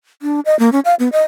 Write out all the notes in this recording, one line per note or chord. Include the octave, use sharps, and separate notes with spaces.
D4
D#5
A#3
C#4
F5
B3
D#5